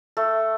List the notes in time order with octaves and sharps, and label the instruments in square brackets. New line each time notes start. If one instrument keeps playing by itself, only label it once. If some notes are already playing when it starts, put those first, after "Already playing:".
[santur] A3